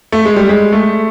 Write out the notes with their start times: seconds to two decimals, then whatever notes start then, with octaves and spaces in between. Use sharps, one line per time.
0.12 A3
0.25 G#3
0.36 G3
0.49 G#3
0.73 A3